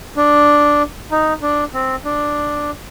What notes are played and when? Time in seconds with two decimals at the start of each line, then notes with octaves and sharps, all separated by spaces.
0.17 D4
1.11 D#4
1.42 D4
1.74 C4
2.05 D4